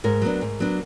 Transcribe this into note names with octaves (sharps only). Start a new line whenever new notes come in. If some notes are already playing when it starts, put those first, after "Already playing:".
G#2 A#4
F#3 B3 D4
G#2
F#3 B3 D4